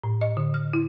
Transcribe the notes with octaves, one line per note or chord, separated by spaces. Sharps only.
A2
D#5
D3
F6
E4